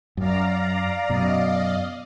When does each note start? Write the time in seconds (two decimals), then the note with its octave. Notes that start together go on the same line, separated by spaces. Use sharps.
0.17 F#2 D5 F5 A#5
1.10 F#2 B2 D5 D#5 F5